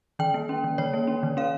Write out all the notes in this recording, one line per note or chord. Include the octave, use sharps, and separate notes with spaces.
D#3 G5
A#3
C#4
D#3
D#3 C#5
A#3
C#4
D#3
C#4 F5